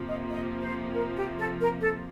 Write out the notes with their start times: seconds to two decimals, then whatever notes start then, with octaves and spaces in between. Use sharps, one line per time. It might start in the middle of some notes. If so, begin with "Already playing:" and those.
Already playing: F2 C3 F3 A#3
0.08 D#5
0.30 D#5
0.62 C5
0.95 A#4
1.17 G4
1.39 A4
1.60 A#4
1.81 A4